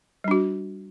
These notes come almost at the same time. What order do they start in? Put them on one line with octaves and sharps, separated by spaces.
G3 D4 F#4